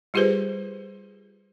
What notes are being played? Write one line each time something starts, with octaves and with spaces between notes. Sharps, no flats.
G3 F4 G4 G#4 B4 C5